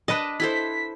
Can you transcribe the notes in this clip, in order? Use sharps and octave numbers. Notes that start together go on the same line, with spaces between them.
D4 B4 D#5 A5
E4 A4 C5 B6